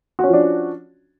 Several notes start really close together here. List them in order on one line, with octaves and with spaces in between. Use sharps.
F#4 C#4 F3 D4